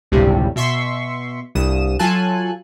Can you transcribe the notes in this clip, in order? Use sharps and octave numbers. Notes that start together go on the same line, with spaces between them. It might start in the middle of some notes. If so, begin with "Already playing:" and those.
G1 C#2 A2 C3 G3
B2 E5 C6 C#6 B6
C2 G2 D#6 E7
F#3 F4 A4 G#5 A5 F#6